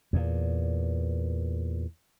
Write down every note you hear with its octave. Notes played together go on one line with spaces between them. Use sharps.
E2 A#2